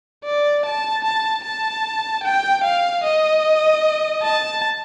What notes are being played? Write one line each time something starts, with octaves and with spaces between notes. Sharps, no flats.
D5
A5
A5
A5
G5
F5
D#5
A5